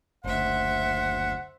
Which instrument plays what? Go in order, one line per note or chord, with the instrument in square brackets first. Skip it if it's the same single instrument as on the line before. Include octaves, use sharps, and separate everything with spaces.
[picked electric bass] F#1 D2 [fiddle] C5 E5 [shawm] F#5